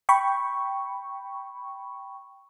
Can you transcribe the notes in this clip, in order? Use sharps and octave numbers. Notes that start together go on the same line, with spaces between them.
G5 B5 C#6